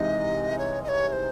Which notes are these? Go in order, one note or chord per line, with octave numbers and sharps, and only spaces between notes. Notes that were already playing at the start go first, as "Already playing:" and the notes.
Already playing: C2 C3 E3 G#3 D#4 D#5
C#5
D#5
C#5
C#5
C5